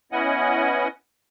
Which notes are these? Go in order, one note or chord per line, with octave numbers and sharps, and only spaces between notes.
B3 C#4 E4 D#5 F#5 G#5